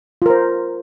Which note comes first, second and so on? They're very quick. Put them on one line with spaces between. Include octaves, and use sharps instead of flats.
F4 A#4 C5